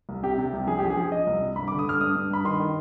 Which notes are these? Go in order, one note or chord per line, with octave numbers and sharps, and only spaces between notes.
C2
C3 G4
C3
C2
F3 G#4
G4
F3
G#4
F3
F3 D#5
C2
C3
G2 B5
D6
D3
D#6
G2 F6
G2 D#6
G2
G2 B5
D#3 C6
D#3